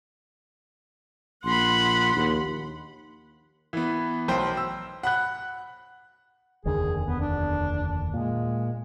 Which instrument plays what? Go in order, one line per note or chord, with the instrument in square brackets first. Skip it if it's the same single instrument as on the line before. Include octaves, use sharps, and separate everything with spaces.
[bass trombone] A#1 [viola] F#5 B5 [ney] C6
[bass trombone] D#2
[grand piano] E3 B3
B1 C5 G5
E6
F#5 B5 F#6
[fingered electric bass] F1 D#2 D3 [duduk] G#4
[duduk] B3
D4
[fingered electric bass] A#2 [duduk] G#3